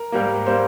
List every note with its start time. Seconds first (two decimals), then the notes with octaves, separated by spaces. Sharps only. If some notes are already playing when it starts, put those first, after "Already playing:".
Already playing: A#4
0.12 G#2 G3 A#3
0.47 G3 A#3 C5